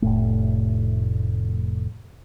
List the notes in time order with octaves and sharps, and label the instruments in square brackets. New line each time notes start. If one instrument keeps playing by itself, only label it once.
[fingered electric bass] F1 A2 A3